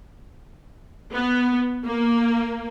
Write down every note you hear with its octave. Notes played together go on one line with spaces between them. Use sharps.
B3
A#3